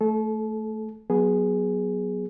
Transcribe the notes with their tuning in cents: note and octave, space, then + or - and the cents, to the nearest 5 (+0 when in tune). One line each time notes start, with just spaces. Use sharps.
A3 +0 A4 -30
F#3 +0 B3 -15 G#4 +0